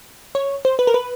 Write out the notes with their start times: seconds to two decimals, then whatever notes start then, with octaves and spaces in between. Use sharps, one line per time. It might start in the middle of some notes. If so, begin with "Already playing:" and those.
0.35 C#5
0.65 C5
0.79 B4
0.87 A#4
0.94 B4